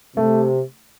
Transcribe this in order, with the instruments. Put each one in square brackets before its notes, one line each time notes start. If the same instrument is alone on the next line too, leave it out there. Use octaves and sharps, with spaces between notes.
[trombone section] C3 [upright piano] A3